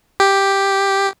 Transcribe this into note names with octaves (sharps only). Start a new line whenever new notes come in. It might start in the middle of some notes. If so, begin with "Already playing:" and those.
G4